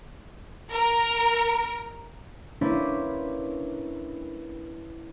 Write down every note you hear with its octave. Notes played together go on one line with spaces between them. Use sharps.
A#4
A#3 C#4 D4 E4 B4 C5